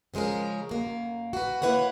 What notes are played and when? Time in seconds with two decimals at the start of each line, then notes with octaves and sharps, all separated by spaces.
0.14 C#3 F3 G#3 C#4 A#4
0.69 F#2 A#3
1.33 F#4 B4
1.62 A#3 E4 B4 C#5 F#5